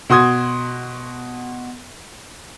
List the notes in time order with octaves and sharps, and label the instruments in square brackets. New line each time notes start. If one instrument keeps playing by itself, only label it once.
[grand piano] B2 F#4 C6 D#6 G#6